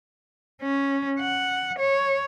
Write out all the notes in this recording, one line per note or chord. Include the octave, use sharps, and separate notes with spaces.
C#4
F#5
C#5